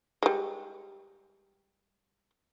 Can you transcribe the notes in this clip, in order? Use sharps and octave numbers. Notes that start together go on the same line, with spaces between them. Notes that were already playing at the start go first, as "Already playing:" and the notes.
G3 G#3